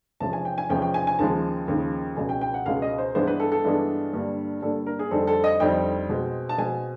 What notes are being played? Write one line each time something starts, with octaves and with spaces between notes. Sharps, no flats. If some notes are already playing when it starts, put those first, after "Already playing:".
E2 C3 F3 G#3 C#4 A5
G#5
G5
G#5
E2 C3 F3 G#3 C#4 G5
G5
G#5
G#5
D#2 C#3 F3 G#3 A5
D#2 C#3 F3 G#3
C#2 B2 G#3 C#4 G#5
G5
G5
F#5
C#2 B2 G#3 C#4 F5
D#5
C5
G2 E3 G#3 B3 D4 C5
B4
A4
A4
G2 E3 G#3 B3 D4
G2 D3 G3 A#3
G2 D3 G3 A#3 A4
A#4
G#4
F2 D3 G3 C4 D#4 A4
A4
D#5
F2 D3 G3 C4 D#4 G5
B2 G#3 C4
A5
B2 G#3 C4 G#5